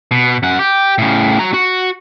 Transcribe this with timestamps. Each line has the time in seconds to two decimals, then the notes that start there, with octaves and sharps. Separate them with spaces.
0.11 B2
0.43 F#2 F#5
0.59 G4
0.98 A2 C#3
1.39 F#4 A#5
1.54 F#4